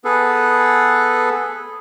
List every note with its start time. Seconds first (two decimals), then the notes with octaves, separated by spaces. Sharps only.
0.05 B3 G#4 A4 B4